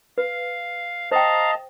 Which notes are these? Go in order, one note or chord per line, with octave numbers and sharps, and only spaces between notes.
B4 F5
C5 D#5 F5 G5 A5 A#5